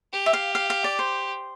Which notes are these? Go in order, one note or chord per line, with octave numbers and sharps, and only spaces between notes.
G4
E5
F5
F5
F5
D5
C5